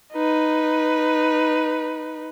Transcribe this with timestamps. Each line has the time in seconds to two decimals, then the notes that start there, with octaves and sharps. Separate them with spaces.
0.13 D#4 B4